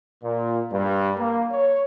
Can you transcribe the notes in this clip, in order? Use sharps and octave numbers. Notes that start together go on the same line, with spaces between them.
A#2
G2
A#3
C#5